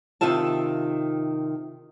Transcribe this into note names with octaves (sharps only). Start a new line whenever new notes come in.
C3 D#3 F4 E5 A5